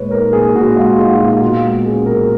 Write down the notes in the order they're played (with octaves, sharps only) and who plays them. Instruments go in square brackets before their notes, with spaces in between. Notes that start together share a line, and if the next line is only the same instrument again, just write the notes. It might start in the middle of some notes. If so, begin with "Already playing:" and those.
Already playing: [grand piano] A#2 G#3 B4 C#5
D#4 A#4
A#2 G#4
A#2 F#4
G#3 F4
D#4 G#4
F#4
A#2 F4
B2 F#4
G#3
C#4 G#4
B2 A#4